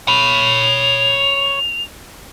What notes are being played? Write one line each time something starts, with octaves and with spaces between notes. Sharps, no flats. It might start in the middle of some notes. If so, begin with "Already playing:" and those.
C#5 B5 F7